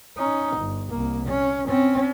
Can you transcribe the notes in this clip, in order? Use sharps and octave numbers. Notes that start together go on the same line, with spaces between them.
C#4 D#4
G1
C2 A#3
C#4
C4 C#4